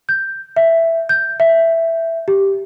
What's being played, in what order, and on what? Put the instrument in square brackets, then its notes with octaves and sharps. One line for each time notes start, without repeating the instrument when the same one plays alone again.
[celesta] G6
E5
G6
E5
G4